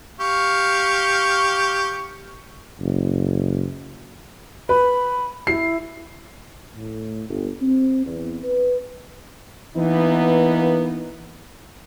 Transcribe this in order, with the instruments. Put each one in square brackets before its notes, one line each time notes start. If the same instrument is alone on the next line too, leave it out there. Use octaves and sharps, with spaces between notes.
[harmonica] G4 F5 C#6
[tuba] F#1
[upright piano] B4 [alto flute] B5
[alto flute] E4 [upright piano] C7
[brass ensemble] A2
G1
C4
E2
B4
E3 A#3 B3 D#4